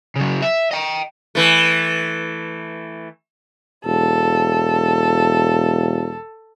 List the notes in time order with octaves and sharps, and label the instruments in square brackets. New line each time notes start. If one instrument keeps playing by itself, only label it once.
[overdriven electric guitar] C#3 F#3
E5
D#5 G5
[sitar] E3 A3
[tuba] E1 [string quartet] A4